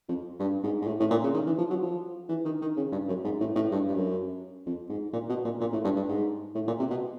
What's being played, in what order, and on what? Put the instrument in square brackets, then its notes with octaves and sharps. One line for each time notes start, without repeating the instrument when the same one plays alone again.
[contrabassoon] F2
G2
G#2
G#2
A2
A2
A#2
C#3
D#3
E3
F3
F#3
F3
E3
D#3
D#3
C#3
G2
F#2
G#2
A2
A2
G2
G2
F#2
F2
G#2
A#2
B2
A#2
A#2
A2
G2
G2
G#2
A2
A#2
C3
B2